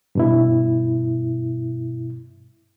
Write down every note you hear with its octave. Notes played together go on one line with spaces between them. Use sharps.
G2 B2 E4